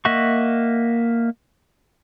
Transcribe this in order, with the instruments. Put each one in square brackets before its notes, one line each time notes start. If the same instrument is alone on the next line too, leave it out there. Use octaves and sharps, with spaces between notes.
[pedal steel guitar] A#3 D#5 E5 F#5 C#6